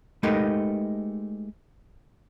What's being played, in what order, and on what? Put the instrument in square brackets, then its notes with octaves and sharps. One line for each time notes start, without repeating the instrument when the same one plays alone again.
[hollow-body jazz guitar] G#3 A3 D#4 G4 A#4 B4